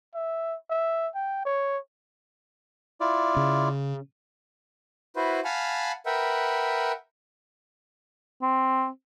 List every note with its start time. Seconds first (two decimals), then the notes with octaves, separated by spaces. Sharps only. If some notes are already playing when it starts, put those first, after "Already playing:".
0.14 E5
0.70 E5
1.15 G5
1.45 C#5
3.00 E4 F4 D5
3.37 C#3
5.16 E4 F#4 B4 C5
5.45 F5 F#5 G#5 A5 B5 F6
6.06 A#4 B4 E5 F#5 G5
8.42 C4